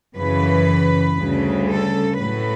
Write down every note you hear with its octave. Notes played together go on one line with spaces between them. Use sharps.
F#2 C#3 E3 B4
D2 C#3 G3
A4
A2 F#3 A3 B4